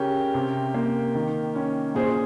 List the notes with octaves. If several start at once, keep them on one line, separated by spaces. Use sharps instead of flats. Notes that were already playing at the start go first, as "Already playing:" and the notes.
Already playing: C#3 C#4 G4 A#4
C3
A#3
D#3
C#4
A#2 G#4 C5